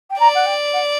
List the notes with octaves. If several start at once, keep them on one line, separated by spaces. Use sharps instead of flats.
G5
D5 A#5
F#5
G5
F#5